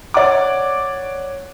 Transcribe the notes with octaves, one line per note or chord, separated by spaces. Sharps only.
C#5 D5 F#5 D6